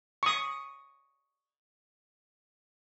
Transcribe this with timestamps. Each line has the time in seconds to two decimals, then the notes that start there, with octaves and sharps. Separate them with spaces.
0.23 C#6 D#6